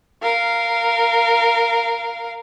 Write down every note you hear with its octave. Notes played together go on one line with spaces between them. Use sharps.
A#4 F5